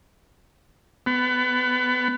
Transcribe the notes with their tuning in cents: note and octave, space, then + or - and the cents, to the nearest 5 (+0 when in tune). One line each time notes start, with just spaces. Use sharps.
B3 +25